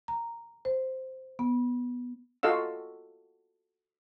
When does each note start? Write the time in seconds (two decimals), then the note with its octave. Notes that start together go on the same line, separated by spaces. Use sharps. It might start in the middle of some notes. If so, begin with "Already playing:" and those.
0.08 A#5
0.65 C5
1.39 B3
2.43 F4 F#4 A4 D#5 F5 E6